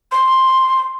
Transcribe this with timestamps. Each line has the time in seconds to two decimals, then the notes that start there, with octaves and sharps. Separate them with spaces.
0.12 C6